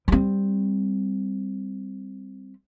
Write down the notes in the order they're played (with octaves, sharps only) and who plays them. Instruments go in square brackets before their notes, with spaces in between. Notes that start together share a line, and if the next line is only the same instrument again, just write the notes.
[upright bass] G3 C4